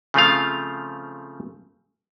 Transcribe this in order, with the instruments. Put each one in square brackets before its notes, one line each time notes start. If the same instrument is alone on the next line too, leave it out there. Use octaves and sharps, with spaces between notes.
[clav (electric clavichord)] C#3 F3 A3 C4 F4 F5